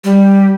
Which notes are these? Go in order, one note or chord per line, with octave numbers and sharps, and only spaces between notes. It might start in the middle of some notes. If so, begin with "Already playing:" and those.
G3